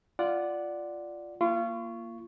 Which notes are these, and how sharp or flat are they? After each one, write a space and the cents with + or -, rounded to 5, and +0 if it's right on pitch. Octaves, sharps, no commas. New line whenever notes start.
F4 -10 D5 +0 F#5 +0
A#3 +0 F4 -30 C#6 +0